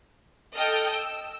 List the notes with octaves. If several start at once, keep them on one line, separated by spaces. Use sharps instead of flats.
A4 D#5 G5 F6
E6